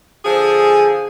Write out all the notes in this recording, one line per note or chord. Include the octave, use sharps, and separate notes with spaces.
D3 F3 G#4